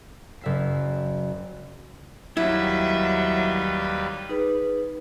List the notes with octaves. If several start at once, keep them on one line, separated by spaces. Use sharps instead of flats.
F#1 E5 C7
D#2 F#3 G3 E4 B4 E5
D#4 G#4 B4